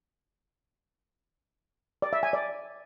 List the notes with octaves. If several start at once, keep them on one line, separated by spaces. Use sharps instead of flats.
D5
E5
G#5
D5